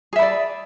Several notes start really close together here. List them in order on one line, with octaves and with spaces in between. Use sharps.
G#4 E5 B5 D5